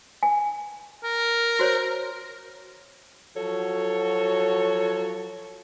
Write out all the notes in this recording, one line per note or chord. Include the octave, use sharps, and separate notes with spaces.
G#5
A#4
F#4 C5 C#5
F3 F#3 F#4 A4 C#5